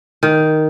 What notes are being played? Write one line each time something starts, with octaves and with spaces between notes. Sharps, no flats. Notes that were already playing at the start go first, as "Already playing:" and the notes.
D#3